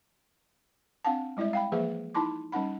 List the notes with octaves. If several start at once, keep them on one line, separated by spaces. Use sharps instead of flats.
C4 D4 F5 F#5 A5
G3 G#3 E4 D5 E5
F5 G5 B5
E3 F3 A#3 G#4 B4 E5
D#4 E4 A5 C6 D6
G3 C#4 D#4 F#5 B5